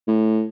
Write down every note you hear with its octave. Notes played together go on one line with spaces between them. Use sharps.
A2